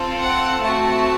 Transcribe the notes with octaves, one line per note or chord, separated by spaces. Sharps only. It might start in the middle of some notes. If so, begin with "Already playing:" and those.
Already playing: C4 F4 A4
F#5
A3 C4 F#4 A5